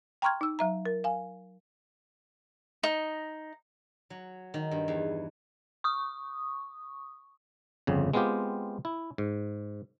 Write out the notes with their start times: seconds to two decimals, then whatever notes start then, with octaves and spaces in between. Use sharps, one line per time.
0.22 G5 A#5 C6 C#6 F6 G#6
0.41 D#4 E6
0.59 F#3 E5 A#5
0.86 A#4
1.04 F5 G#5
2.83 D#4
4.10 F#3
4.54 D#3
4.71 G2
4.88 E2
5.84 C#6 D#6
7.87 G1 F2 C#3
8.13 G#3 B3 C4 F4 G4
8.85 E4
9.18 G#2